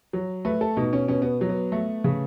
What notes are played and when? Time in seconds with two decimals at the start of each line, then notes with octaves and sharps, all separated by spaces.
0.13 F#3
0.45 A3 B4
0.61 A4
0.77 B2 D#4
0.93 C#4
1.08 B2 C#4
1.22 B3
1.41 F#3
1.49 B3
1.72 A3
2.04 C#3